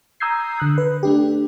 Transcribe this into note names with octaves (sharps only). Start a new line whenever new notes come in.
A#5 D#6 E6 G6 G#6 C7
D3 F#6
B4
A3 D4 G4